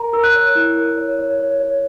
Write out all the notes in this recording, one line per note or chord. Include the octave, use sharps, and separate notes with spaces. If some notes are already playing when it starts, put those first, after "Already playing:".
Already playing: A#4 A#5
A#4 E6
F#6
C#5
E4 F#6
A#4
C#5
C#5
C#5
C#5